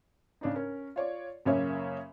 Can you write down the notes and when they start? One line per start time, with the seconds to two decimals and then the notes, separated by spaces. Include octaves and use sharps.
0.41 C#3 D4 D#4
0.54 C#4 A#4
0.96 F4 C#5 D5
1.45 F#2 C#3 A#3 C#4 C#5 E5